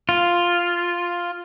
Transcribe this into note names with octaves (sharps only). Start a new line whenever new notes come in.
F4